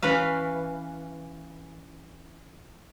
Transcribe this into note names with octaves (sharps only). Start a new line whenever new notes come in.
E3 C#4 B4 F5